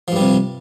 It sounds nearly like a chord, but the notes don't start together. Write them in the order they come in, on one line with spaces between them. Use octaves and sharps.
F3 G2 G3 C3